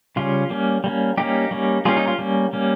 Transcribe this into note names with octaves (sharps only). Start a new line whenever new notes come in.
C#3 G3 C#4 F4
G3 A#3 C#4
G3 A#3 C#4
G3 A#3 C#4 D#4 G4
G3 A#3 C#4
G3 A#3 C#4 F4 G#4
D#4
F4
G3 A#3 C#4
G3 A#3 C#4